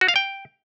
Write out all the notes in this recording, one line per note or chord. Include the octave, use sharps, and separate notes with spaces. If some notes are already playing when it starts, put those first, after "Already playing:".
F#4
F5
G5